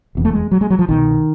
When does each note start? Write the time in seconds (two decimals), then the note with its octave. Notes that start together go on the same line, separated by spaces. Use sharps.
0.15 F1 E2 C#3
0.25 A3
0.33 G#3
0.51 F#3
0.61 G#3
0.70 F#3
0.79 F3
0.89 C2 B2 D#3